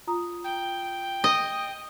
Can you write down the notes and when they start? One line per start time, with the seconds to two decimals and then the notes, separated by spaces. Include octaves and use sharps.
0.07 F4 A#5 D#6
0.44 G5
1.24 D#5